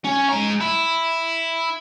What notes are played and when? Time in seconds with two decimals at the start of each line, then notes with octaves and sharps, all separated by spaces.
0.04 C#4
0.29 G#3 A#5
0.61 E4